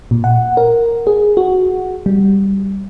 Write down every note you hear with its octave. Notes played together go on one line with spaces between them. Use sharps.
A#2
F#5
A#4
G#4
F#4
G3